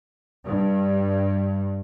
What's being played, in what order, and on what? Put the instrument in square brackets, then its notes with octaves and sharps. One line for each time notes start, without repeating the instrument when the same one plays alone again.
[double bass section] G2